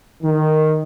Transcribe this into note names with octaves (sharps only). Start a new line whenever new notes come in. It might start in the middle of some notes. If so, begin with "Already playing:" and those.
D#3